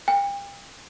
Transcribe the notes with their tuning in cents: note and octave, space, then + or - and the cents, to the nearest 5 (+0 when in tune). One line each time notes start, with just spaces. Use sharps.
G5 +35